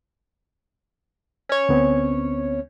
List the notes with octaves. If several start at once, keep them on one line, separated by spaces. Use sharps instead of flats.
C#4 C#5
D2 B3 C4